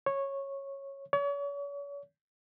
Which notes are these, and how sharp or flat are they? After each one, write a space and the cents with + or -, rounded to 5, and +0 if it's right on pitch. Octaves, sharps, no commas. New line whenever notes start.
C#5 -10
C#5 +40